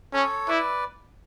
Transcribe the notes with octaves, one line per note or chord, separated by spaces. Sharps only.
C#4 A4 C#5
E4 B4 D5